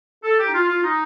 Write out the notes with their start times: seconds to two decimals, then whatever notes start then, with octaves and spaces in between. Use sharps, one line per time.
0.24 A4
0.39 G4
0.47 D#4
0.54 F4
0.69 F4
0.84 D#4